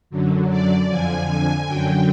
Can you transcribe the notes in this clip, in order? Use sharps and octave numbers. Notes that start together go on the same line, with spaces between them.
F#2 D3 F#3
D5
F2 D3 F3 G#5
G#5
F#2 D3 F#3 G5